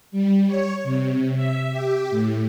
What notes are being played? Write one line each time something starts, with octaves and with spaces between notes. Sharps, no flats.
G3
C#5
C3
E5
G4
A2